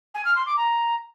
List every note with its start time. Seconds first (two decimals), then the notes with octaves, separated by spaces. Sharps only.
0.14 G#5
0.25 F6
0.36 C6
0.46 D6
0.57 A#5